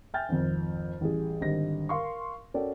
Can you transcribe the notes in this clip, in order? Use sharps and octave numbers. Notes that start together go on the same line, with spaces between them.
E5 G5 G#5 F6 G6 A6
G#1 F2
A1 G3 G#4
G#1 D3 G3 D#5 A#6
A#4 F5 C6 C#6
C#4 F#4 A4 A#4 D5 G5